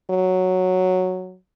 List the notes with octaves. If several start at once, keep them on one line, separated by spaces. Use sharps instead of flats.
F#3